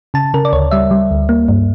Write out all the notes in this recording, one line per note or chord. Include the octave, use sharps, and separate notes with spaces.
C#3 A5
C#3 A#4
D5
D2 C#5
G3 E5
G3
D2
A#3
G2